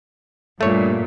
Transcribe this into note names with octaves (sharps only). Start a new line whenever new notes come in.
G2 A#2 A3 C#5